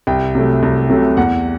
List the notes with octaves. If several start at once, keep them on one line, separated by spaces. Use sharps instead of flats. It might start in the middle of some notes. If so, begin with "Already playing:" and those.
C2 G5
C3 F#3 A3
C2
C3 F#3 A3
E2 F#5